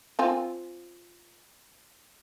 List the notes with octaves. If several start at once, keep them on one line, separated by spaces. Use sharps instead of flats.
C4 F4 G#5